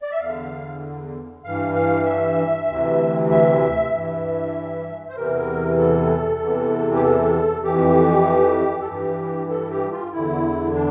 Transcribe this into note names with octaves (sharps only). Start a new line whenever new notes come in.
D5
E5
E2 D3 F5
G2 E3 F5
F5
E5
D2 C3 E3
E5
G2 E3
C5
E2 C3 E3 A#4
A4
E2 C3 E3
G4
A4
F2 E3 G4
A4
G2 E3 G4
A4
G4
F4
E2 D3 E4
D4